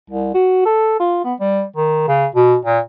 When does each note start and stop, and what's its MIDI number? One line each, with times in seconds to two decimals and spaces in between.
0.10 0.30 36
0.34 0.62 66
0.66 0.97 69
1.00 1.20 65
1.24 1.34 59
1.40 1.62 55
1.76 2.04 51
2.08 2.26 49
2.35 2.56 47
2.65 2.79 46